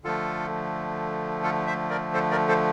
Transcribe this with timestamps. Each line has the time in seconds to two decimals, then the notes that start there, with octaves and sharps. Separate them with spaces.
0.04 D3 F3 A3 F4 A4
1.43 F4 A4
1.67 C5 E5
1.90 A#4 D5
2.14 A4 C5
2.31 A#4 D5
2.48 A4 C5